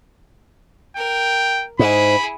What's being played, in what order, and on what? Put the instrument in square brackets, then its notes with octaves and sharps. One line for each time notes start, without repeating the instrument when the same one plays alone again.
[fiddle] A#4 [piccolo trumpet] G5
[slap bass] G#2 [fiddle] E4 G#4 [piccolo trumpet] B5